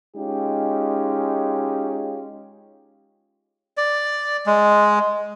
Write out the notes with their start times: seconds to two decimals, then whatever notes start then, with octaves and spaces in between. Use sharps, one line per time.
0.17 G#3 C#4 D#4 F4 G4
3.77 D5
4.46 G#3